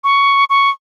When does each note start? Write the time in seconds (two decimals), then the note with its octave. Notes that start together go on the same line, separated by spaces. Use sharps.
0.04 C#6
0.50 C#6